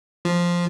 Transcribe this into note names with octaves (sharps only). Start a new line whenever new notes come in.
F3